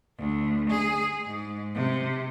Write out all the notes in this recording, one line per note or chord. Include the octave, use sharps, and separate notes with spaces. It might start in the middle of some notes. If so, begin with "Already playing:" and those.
D2
G#4
G#2
C3